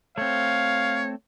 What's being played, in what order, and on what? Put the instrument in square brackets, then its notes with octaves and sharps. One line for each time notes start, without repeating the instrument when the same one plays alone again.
[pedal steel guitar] A3 C4 [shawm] C#5 [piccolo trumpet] F5